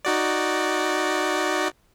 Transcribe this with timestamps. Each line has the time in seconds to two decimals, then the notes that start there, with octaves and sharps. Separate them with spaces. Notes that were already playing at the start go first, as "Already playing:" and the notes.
0.05 D#4 F#4 D5